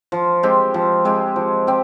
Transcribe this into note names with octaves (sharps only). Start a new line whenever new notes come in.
F3
G#3 C4 G4
F3
G#3 C4 G4
F3
C4 G4